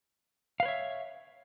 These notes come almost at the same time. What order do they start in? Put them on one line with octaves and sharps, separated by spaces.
F5 B4 C#5 E5